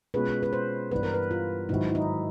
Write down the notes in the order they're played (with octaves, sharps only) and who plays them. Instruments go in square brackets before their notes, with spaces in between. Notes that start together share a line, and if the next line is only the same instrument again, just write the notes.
[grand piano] B2 G#3 C#4 F4 G#4 [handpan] B4
[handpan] B4
C5
[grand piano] G2 E3 G3 B3 [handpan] B4
[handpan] A#4
B4
F4
[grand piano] G#2 D#3 F#3 [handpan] E4
[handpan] E4
D#4